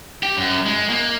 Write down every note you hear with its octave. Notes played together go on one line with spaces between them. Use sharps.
G4
F#2
G#3
A#3